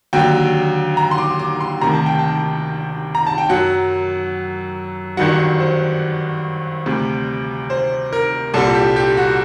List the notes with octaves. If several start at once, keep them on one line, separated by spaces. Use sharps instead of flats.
D#2 D3 F#3 G5
A#5
C6
D6
D6
C6
D2 C3 D#3 A#5
A5
G5
A5
A#5
A5
G5
F#2 F#3 F#5
G1 G2 D#3 F#3 F#5
C5
D2 C3 G3
C5
A#4
C2 A#2 G3 A4
G4
G4
F#4